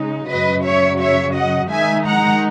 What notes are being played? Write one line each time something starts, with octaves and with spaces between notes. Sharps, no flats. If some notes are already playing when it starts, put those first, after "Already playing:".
Already playing: C#3 G#3 D#4
F#2 C#3 F#3 B4 D#5
C#5 E5
C#5 E5
D#5 F#5
D#3 G#3 D#4 E5 G#5
F#5 A#5